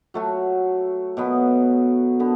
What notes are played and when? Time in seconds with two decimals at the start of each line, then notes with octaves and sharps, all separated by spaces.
0.14 F#3 A3 F#4
1.17 B2 F#3 B3
2.20 D3 B3